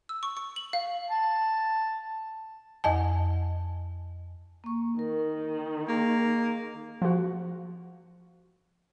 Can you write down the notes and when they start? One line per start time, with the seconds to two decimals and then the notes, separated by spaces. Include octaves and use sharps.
0.09 E6
0.23 C#6
0.37 C#6
0.56 F#7
0.73 F5
1.10 A5
2.84 F2 D#5 G#5 A5
4.64 A#3 C#6
4.99 D#3 A#4
5.88 A#3 G#4
7.02 F3 F#4